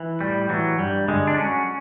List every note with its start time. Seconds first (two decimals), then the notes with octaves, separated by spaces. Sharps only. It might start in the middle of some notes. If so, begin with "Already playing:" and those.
Already playing: E3
0.21 A2 G3
0.49 E3 F#3
0.78 G2 G3
1.08 D3 G#3
1.27 D4
1.37 F#3 C#4